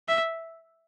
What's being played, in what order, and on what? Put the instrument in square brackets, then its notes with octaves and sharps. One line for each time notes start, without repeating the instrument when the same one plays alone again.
[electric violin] E5